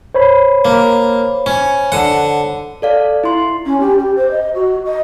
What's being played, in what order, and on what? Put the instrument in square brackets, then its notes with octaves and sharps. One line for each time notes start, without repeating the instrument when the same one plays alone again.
[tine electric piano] C5 C#5 B5
[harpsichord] A#3
C#4
D3 F#5
[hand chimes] A4 D5 F5
E4 C6
[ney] C#4
G4
G4
C5
D#5
F#4
D#5